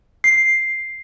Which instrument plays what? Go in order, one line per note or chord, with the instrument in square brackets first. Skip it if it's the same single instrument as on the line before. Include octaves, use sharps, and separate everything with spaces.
[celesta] C7